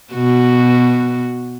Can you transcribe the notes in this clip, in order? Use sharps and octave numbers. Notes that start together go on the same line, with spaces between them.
B2 F#4